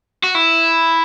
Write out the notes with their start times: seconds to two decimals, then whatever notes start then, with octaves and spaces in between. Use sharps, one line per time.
0.23 F#4
0.35 E4